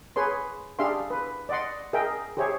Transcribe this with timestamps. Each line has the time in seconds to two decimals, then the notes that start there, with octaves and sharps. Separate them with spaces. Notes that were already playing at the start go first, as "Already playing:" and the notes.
0.16 G#4 B4 C#5 C6
0.79 D4 G4 G#4 E5 F5 C6
1.10 B4
1.49 D5 D#5 F#5 C6
1.93 G#4 A#4 D#5 E5 G5
2.37 G4 G#4 C5 C#5 E5